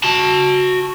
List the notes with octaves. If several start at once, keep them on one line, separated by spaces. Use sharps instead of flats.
F#4 A5